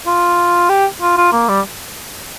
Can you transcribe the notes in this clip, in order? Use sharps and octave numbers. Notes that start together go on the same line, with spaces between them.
F4
G4
F4
F4
A#3
G3